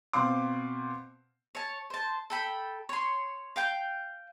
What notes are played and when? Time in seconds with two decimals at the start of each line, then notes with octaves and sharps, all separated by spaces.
0.13 B2 C4 C5 F5 C6 D6
1.55 C#5 A5
1.90 C5 A5
2.30 A4 G5 B5
2.89 C#5 C6
3.56 F5 G5 G6